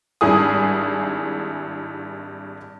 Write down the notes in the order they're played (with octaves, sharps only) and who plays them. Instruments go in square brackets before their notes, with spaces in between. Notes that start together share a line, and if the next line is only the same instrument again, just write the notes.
[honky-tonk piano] G#1 G2 E4 G#4 D#6